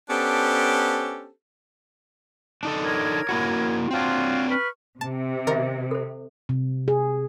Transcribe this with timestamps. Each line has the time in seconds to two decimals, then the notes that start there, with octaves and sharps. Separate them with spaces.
0.08 B3 C#4 D4 G4 A4 C5
2.63 D4 D#4 A4
2.83 A#4 C#5 G#6
3.29 A#3 E4 F#4
3.91 C4 D4 F4 F#4 C#5
4.49 B4 C#6 F6
5.01 C3 A5
5.47 D#3 A#4 D#5 E5
5.91 A4 C5
6.49 C3
6.88 G#4